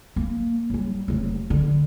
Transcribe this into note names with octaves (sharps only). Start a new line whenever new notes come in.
A#3
F#3 G3
F1 F#3
D3